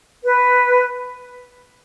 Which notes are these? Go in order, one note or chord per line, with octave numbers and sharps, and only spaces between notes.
B4